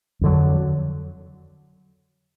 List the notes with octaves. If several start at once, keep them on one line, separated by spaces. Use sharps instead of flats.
F2 D3 F#3